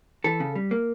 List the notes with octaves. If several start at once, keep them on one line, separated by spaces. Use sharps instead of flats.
E3 A4
C#3
G3
A#3